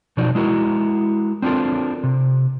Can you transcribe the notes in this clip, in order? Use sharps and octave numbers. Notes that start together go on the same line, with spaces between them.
B2 F3 F#3 D#4 D5
G#3 E4 F#4 A#4
C4 D4 F4 A4 A#4
C3